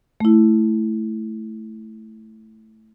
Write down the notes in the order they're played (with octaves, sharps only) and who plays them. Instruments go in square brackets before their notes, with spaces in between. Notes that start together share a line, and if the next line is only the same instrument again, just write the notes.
[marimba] A3 E4